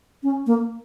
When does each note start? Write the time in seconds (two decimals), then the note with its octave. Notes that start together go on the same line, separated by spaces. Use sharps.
0.23 C#4
0.47 A#3